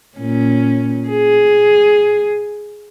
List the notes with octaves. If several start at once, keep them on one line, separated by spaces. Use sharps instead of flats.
A#2 C#4
G#4